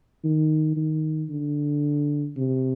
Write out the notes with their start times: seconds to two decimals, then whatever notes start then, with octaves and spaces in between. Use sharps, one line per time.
0.24 D#3
0.77 D#3
1.30 D3
2.37 C3